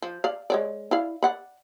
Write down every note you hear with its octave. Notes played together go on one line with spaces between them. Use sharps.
F3
D5 F5
G#3 C#5 D5
E4 D5 F5
D5 F#5 B5